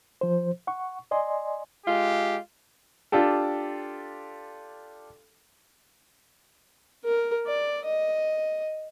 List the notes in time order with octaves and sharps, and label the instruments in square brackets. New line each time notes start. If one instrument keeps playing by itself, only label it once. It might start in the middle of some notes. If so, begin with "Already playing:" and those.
[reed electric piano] F3 C5
F#5 C#6
D5 D#5 G#5 C6
[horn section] G#3 F4 G4
[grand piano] D4 F4 G4 A4
[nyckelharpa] A#4
D5
D#5